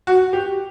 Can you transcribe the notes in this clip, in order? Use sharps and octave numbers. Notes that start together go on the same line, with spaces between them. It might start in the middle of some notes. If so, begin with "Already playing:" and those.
F#4
G4